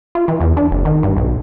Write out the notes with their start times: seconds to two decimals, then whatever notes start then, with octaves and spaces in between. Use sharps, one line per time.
0.15 F4
0.28 E3
0.40 E2
0.57 D4
0.71 F#1
0.85 D#3
1.03 G2
1.17 B1